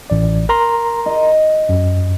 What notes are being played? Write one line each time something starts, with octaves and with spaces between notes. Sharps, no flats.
A1 D5
A#4 A#5 C6
D#5
F#2